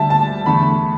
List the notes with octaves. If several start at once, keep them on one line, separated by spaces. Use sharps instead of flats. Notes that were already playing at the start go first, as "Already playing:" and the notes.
Already playing: D2 D3 G3 E5 A5
A5
E2 D3 A3 B5